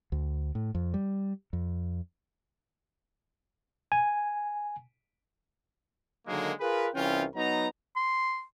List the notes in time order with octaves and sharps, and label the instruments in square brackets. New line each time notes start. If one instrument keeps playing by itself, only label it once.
[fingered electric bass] D2
A2
F2
G3
F2
[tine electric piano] G#5
[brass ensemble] D3 D#3 F#3 G#3 A#3
F4 G#4 A#4 B4
C2 E3 C#4 F4 G5
F#3 B3 D#4 A#5
[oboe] C6